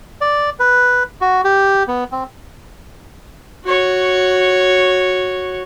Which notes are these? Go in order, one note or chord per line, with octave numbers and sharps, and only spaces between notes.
D5
B4
F#4
G4
B3
C4
F#4 C#5